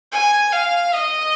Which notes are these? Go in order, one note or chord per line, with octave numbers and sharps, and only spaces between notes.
G#5
F5
D#5